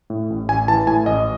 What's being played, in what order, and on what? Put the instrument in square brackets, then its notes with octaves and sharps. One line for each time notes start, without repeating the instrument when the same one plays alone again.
[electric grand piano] A2
A1
A1 G#5
E3 A5
A2 G#5
A1 D#5